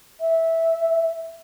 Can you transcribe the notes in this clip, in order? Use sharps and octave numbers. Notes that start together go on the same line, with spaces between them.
E5